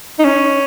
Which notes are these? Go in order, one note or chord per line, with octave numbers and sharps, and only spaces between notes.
D#4
C#4